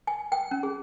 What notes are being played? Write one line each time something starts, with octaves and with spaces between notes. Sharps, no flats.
G#5
G5
C#4
G#4